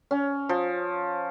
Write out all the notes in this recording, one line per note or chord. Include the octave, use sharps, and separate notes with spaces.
C#4
F3